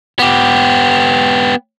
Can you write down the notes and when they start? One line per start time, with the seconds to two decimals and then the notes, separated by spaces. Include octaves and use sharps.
0.19 B3 G4